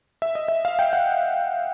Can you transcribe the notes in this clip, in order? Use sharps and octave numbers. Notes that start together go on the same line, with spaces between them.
E5
D#5
E5
F5
G5
F#5